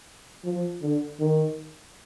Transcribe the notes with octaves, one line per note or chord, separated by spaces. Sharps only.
F3
D3
D#3